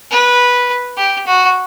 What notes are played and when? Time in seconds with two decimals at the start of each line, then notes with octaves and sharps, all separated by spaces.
0.11 B4
0.97 G4
1.27 F#4